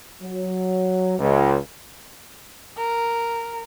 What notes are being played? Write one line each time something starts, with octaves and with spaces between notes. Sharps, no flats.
F#3
C#2
A#4